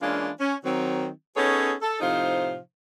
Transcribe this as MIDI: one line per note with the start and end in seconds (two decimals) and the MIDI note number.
0.01 0.30 52
0.01 0.30 56
0.01 0.30 58
0.01 0.30 61
0.01 0.30 62
0.01 0.30 65
0.40 0.55 61
0.64 1.09 51
0.64 1.09 54
0.64 1.09 60
1.37 1.73 59
1.37 1.73 61
1.37 1.73 63
1.37 1.73 68
1.37 1.73 69
1.37 1.73 73
1.81 1.97 69
2.00 2.58 45
2.00 2.58 48
2.00 2.58 53
2.00 2.58 63
2.00 2.58 72
2.00 2.58 77